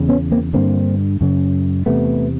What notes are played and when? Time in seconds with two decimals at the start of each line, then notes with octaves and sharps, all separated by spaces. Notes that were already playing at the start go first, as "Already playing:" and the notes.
Already playing: E2 C#3
0.09 B3 C#4
0.32 A#3 C4
0.53 G2 D3 A#3 C4
1.21 F#2 C#3
1.86 E2 C3 A3 B3